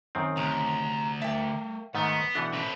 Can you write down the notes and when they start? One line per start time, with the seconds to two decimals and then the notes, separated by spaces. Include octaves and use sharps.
0.15 F#2 D#3 C4
0.37 D2 C3 A#5
1.22 A3 A#4 E5 G5 A5
1.95 G#2 D#3 A3 B3 F#5
2.35 B2 E3 A3 D4
2.53 C4 C#4 E4 B4